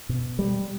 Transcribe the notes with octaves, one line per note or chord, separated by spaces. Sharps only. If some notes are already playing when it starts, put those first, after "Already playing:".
B2
G3